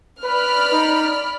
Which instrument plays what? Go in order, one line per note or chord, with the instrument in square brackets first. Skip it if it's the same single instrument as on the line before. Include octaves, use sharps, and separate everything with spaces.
[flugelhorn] B4 [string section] D5 B5 F6
[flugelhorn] D#4